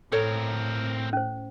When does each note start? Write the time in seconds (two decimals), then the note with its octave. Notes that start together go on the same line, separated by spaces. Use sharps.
0.12 A2 C4 A4 A#4 C#5
1.13 C#4 C5